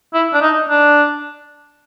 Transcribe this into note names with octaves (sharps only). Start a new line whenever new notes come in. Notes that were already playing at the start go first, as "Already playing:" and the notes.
E4
D4
D#4
D4